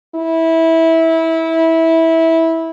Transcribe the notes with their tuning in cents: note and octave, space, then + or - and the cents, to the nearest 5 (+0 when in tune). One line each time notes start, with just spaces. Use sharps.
E4 -15